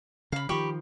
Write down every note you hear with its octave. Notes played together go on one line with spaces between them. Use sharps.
C#3 F5 B5
D#3 F3 G4 B5 C#6